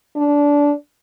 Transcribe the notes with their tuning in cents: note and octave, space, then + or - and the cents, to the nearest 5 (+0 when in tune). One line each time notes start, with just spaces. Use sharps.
D4 -20